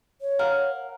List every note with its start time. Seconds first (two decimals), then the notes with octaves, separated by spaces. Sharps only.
0.21 C#5
0.39 A#4 F5 F#5